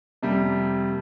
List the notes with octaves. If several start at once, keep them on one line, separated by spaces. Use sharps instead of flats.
F2 C3 G3 A#3